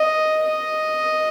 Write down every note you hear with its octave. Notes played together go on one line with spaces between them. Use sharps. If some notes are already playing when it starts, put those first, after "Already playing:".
Already playing: D#5
D#5